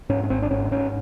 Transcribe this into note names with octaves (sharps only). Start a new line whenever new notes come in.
G#2 C#4
C#4
G#1 C4
D4
G#2 C#4
G#2 C#4